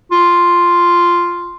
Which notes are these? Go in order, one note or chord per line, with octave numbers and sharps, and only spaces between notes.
F4